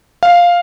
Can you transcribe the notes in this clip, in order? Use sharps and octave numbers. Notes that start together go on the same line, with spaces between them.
F5